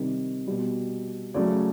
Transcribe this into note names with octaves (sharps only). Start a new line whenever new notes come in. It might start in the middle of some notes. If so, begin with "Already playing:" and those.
Already playing: C3 D#3 G3
B2 G3
C#3 F#3 A3 D5